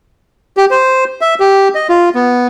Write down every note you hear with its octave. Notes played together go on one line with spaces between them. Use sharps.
G4
C5
E5
G4
D#5
F4
B3